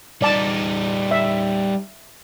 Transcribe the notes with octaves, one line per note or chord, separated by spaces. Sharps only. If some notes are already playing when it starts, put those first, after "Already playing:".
G3 D#4 D5 A5
E5